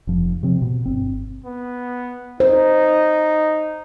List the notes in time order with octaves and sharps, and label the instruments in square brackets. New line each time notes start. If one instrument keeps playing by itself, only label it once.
[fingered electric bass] F1 F3
C3 F3 C4
B2
G1 C4
[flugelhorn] B3
[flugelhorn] D#4 [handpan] C5